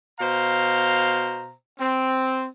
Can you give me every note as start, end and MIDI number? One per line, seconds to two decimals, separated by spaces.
0.20 1.51 47
0.20 1.51 72
0.20 1.51 77
0.20 1.51 82
1.79 2.45 60